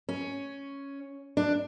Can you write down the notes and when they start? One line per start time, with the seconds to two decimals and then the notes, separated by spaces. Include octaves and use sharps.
0.09 C#4
1.37 D4